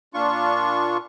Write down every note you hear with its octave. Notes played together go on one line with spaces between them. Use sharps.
A#2 D4 F4 C#6